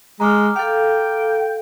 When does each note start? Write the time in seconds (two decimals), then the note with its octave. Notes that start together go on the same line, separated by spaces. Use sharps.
0.20 G#3 A#5 D6 F6
0.56 A4 F5 G5